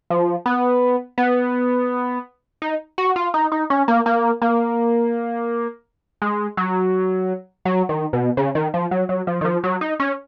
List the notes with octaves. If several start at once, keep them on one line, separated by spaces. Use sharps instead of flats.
F3
B3
B3
D#4
F#4
F4
D#4
D#4
C#4
A#3
A#3
A#3
G#3
F#3
F#3
D#3
B2
C#3
D#3
F3
F#3
F#3
F3
D#3
F3
F#3
D#4
C#4